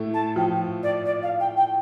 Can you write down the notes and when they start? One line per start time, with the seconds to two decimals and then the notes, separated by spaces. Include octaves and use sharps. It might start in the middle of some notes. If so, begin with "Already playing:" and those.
Already playing: A2 A3
0.13 A5
0.36 F3 G5
0.82 D5
1.05 D5
1.22 F5
1.40 G5
1.57 G5